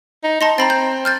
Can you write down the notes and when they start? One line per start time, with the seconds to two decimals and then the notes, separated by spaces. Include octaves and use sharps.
0.24 D#4
0.41 D#4 A5 C6 A#6
0.58 C4 A#5 B5 A6
0.70 G6
1.05 F6 G6 A6